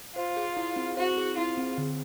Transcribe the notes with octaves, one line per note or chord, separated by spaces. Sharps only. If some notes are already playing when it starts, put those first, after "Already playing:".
F4 C5
G#4
E4
C4
F#4 C5
G#4
E4 F4
C4
D3